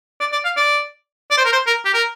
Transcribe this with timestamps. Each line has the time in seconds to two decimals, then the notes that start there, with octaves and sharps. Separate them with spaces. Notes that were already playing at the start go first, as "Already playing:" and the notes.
0.20 D5
0.32 D5
0.45 F5
0.57 D5
1.31 D5
1.38 C5
1.45 A#4
1.53 C5
1.67 A#4
1.85 G4
1.94 A#4